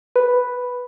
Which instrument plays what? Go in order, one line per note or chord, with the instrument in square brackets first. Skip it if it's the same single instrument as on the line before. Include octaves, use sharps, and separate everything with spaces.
[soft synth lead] B4